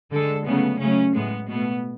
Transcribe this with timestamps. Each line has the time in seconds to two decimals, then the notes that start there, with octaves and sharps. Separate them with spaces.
0.11 D3 G#3 A4
0.45 C#3 F#3 A3 B3
0.80 C#3 F#3 A3 C#4
1.15 A2 G#3 B3
1.49 B2 A3 B3